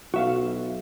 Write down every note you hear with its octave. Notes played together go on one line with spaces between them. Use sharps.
B1 F#4 E5 F5